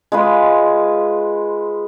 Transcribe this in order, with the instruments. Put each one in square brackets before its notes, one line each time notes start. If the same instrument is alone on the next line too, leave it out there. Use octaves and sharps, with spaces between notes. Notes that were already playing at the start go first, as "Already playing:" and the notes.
[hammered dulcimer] G#3 F4 B4